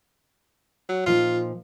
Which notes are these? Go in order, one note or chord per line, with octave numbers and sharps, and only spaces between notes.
F#3
A#2 F3 D#4 F4